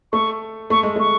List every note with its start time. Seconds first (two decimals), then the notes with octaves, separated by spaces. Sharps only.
0.12 A3 C#6
0.70 A3 C#6
0.83 G#3
0.96 A3 C#6